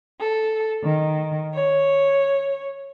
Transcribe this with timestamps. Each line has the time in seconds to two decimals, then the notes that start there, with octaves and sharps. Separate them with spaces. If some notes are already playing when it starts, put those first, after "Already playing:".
0.20 A4
0.82 D#3
1.53 C#5